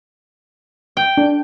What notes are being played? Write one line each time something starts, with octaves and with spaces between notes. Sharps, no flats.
G5
D4